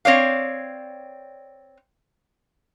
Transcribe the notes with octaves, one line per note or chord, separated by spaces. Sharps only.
C4 C#5 D5 F5